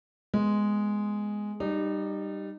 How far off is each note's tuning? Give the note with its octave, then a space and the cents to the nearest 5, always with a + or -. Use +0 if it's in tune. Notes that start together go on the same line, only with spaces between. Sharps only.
G#3 +0 B3 +0
G3 +0 D#4 -25